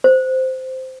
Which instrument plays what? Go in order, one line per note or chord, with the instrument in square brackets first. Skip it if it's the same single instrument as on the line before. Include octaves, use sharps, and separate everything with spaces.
[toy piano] C5